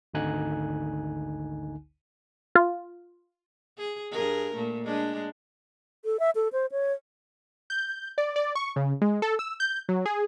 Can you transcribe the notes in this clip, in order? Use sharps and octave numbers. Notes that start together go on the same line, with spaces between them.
G#1 D2 D3 D#4 G#5 F#6
F4
G#4
G2 G#4 A#4
A#2 A3
G#3 D4
A4
E5
A4
C5
C#5
G6
D5
D5
C#6
C#3
G#3
A4
E6
G6
F#3
G#4